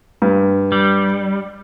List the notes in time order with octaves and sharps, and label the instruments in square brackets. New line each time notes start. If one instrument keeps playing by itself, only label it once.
[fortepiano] G2
[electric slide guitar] G3